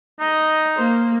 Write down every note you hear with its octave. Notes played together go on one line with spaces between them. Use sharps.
D#4 D#5
A#3 C5